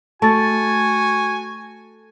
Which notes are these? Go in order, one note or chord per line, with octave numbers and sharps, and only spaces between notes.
A3 F#4 G#5 A5 A6